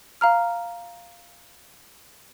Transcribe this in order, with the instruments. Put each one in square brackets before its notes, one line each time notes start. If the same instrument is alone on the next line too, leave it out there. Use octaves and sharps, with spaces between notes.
[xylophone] F5 A#5 F6